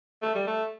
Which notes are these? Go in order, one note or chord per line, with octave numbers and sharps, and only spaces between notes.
A3
G3
A3